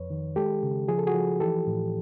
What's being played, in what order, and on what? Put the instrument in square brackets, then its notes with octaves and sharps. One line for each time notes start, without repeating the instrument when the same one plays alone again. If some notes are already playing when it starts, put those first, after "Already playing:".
Already playing: [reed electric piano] F2 B4 C#5
D#3
G#3 G4 A4
C#3
F3 G#4
A4
F#4 G#4
F3
E3 G4 A4
A2